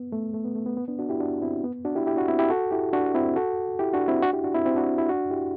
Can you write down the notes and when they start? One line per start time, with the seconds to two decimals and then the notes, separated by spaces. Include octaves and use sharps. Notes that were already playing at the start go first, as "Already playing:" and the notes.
Already playing: B3
0.12 A3
0.34 A3
0.45 B3
0.55 A3
0.66 B3
0.77 B3
0.88 B3 D4
0.99 D4 F#4
1.09 E4 G4
1.20 D4 F#4
1.41 C4 E4
1.64 B3
1.85 D4 F#4
1.95 E4 G4
2.07 E4 G4
2.17 D4 F#4
2.28 C4 E4
2.39 E4 G4
2.50 F#4 A4
2.71 E4 G4
2.93 D4 F#4
3.15 C4 E4
3.36 F#4 A4
3.79 E4 G4
3.94 D4 F#4
4.08 C4 E4
4.22 D4 F#4
4.33 E4 G4
4.44 D4 F#4
4.54 C4 E4
4.65 C4 E4
4.76 D4 F#4
4.98 E4 G4
5.09 D4 F#4
5.30 E4 G4